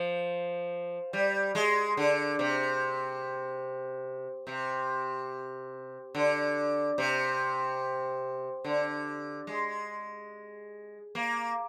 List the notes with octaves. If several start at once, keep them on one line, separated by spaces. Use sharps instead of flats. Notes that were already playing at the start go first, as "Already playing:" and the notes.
Already playing: F3
G3
G#3
D3
C3
C3
D3
C3
D3
G#3
A#3